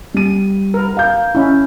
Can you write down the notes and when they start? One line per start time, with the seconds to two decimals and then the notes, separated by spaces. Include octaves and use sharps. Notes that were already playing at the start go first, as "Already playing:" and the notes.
0.14 G3 D#7
0.74 A#4 B4
0.97 F5 A#5 G6
1.35 C#4 E4